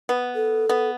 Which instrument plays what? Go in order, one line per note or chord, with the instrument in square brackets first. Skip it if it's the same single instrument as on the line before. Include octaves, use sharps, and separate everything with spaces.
[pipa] B3
[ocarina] A4
[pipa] B3